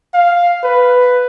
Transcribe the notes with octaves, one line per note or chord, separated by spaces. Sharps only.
F5
B4